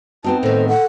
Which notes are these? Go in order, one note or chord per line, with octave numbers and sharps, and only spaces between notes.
B3 C4 D#4 F#4 A5
A2 D#3 A4 C5
A4 F#5